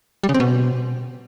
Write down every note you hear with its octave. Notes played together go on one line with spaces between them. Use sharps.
G3
C#3
C4
B2